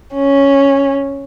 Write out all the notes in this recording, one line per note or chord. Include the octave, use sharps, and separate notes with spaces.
C#4